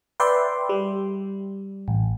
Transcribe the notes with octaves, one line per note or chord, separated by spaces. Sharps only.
B4 D5 E5 G5 C6
G3
A1